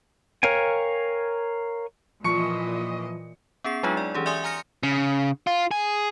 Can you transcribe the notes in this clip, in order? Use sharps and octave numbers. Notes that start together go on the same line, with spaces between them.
A#4 C#5 F5 G5 G#5
A#2 E3 F3 D#5 C#6 C#7
B3 C#4 G#4 C7
F#3 G#3 D4 D#4 F4 G#4
D5
E3 C#4 G4 G#4
D5 E5 G#5 C6 D#6
G#5 A#5 F6 A#6 C#7
C#3
F4
G#4